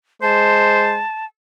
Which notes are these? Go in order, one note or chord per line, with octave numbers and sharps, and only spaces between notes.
G#3 C5 A5